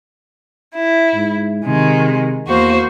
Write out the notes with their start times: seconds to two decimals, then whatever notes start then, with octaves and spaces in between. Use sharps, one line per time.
0.74 E4
1.15 G#2
1.66 C3 D#3 G#3
2.47 E2 A#3 F#4 C5